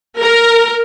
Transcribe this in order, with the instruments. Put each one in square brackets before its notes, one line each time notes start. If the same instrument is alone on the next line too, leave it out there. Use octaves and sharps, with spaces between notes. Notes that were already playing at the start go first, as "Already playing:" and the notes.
[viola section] A#4